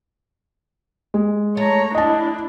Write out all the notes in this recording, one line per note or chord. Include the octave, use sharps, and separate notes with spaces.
G#3
A3 C#5 A#5
D4 E4 D#5 A5